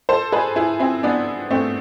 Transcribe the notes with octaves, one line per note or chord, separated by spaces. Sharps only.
A4 C5
G#4 B4
E4 G#4
C4 E4
B3 D4
A3 C4